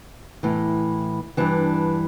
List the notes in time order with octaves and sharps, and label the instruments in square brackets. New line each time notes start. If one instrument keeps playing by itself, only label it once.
[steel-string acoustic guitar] A2 E3
G2 E3 D4